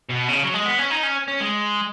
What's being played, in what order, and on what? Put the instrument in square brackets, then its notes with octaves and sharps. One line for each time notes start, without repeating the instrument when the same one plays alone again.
[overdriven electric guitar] B2
C#3
F#3
G#3
B3
C#4
D#4
C#4
C#4
G#3